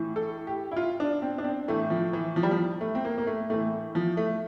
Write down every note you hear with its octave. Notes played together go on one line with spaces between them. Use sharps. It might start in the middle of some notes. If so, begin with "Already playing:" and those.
Already playing: A2 E3
A4
G4
E4
F4
D4
C4
D4
C4
A2 E3 A3
F3
E3
F3
G3
F3
A3
C4
A#3
A#3
A3
A2 E3 A3
F3
A3